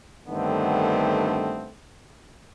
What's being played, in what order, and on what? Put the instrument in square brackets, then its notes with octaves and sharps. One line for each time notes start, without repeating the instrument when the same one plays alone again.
[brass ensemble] G2 D3 D#3 A3 B3 C4